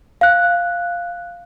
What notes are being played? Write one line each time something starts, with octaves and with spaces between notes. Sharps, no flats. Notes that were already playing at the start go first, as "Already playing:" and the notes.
F5 F#6